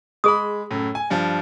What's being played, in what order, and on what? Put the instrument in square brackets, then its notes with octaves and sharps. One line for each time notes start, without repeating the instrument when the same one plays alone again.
[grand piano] G#3 B5 [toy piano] G#4 D#6
[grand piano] F#2 A2
G#5
G2 F3